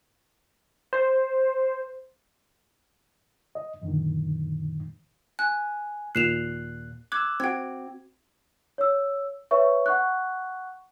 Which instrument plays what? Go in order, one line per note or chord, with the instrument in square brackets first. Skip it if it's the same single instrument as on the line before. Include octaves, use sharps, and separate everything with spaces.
[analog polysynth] C5
[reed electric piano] D#5
F#2 A#2 D3 D#3
[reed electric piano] G#5 [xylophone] F#6
[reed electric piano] D#2 A#2 F#6 [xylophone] C7 E7 F7
[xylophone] D6 G#6 [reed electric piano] E6 F#6
[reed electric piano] C4 F#4 [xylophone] G5 G#6
[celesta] C#5 E6
B4 C#5 E5 C#6
F#5 C#6 F#6